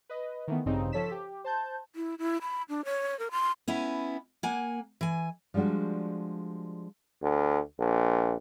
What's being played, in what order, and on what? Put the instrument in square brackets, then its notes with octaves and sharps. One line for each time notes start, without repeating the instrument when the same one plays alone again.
[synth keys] B4 D#5
D#3 E3 A3 B3
A1 G2 C#3 C4 D#4
F3 A4 C#5 B6 E7
G4
C5 A5 G6
[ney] E4
E4
B5
D4
C#5
A#4
C6
[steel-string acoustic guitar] B3 C#4 E4
A#3 F#5 G#5
E3 G#5
[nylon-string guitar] F3 G3 G#3 D4 F#4
[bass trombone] D2
A#1